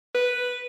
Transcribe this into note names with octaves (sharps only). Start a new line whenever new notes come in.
B4